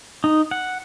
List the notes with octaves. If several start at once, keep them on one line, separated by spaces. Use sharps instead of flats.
D#4
F#5